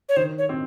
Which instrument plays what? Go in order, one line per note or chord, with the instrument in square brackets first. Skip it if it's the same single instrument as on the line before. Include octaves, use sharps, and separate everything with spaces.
[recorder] C#5
[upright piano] D#3 [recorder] C5
[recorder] C#5
[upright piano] C4